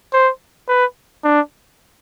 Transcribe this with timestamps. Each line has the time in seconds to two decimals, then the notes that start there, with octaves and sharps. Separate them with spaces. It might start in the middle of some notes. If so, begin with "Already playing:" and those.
0.13 C5
0.68 B4
1.24 D4